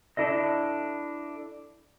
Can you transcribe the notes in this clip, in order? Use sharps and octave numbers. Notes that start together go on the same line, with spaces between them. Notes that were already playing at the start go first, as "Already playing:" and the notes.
D4 E4 A4 D#5